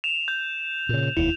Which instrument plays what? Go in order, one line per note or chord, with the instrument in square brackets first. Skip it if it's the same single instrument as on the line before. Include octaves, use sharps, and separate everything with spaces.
[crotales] E7 F7
G6
[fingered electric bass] A#2 C#3
[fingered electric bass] E1 D#2 [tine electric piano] E4 [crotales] F7